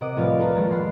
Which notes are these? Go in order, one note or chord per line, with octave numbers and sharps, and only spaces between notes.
C3 A#4 D#5 F#5 D6 D#7
C2 A2 F3 B4 D5 F5
F4 A4 B4 A#5
F2 A2 D#3 G#3 A#3 D4
F#5 B5 C6 F6